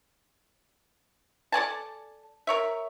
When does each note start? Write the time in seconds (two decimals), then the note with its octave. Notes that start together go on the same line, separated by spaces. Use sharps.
1.52 A4 D5 G#5 A5
2.47 A#4 C#5 E5